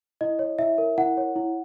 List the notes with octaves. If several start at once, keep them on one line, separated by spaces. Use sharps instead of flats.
E4 D#5
C#5
E4 E5
A#4
E4 F#5
C#5
E4